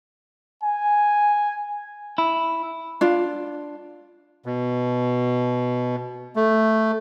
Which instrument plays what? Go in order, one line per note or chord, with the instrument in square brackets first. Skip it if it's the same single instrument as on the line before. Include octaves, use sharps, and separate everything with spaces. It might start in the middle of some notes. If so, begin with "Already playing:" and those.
[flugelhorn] G#5
[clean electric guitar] E4
[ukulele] D4 F4
[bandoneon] B2
A3